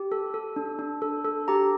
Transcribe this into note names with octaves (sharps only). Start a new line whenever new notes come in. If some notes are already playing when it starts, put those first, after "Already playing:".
Already playing: G4
A4
A4
D4
D4
A4
A4
G4 A#5